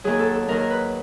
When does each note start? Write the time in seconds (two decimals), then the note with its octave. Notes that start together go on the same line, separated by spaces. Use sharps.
0.04 D#2 D#3 F#3 G#4
0.19 A4
0.34 A4
0.48 D#2 D#3 F#3 A#4
0.60 A#4
0.70 B4